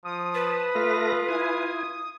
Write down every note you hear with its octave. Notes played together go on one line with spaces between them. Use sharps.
F3 D#6
B4 A5
A3 F4 A4 A#6
E4 G#5 D#6